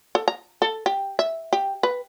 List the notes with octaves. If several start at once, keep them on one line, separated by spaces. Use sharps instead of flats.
A4
A#5
A4
G4
E5
G4
B4